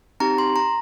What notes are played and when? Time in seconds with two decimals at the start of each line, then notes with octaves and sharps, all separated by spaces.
0.20 C4 D#4 G4 A#5
0.38 C6
0.56 A#5